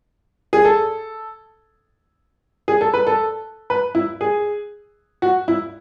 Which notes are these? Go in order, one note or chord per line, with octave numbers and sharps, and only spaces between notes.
G#4
A4
G#4
A4
B4
A4
B4
E4
G#4
F#4
E4